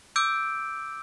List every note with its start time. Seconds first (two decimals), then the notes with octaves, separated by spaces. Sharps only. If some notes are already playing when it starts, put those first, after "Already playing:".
0.16 D6 E6 G6 D7